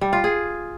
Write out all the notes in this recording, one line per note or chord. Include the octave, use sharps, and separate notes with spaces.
G3
F4
G#4